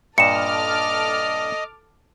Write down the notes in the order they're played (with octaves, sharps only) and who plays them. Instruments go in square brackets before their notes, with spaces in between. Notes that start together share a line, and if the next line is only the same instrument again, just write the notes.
[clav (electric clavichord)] G2 A#2 [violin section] A4 D6 F6 [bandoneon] D#5 [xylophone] C#7 E7